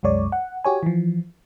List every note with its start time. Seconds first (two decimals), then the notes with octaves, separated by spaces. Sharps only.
0.03 C2 F#2 G#3 C#5 D5
0.32 F#5
0.64 F#4 G4 C#5 G#5
0.83 E3 F3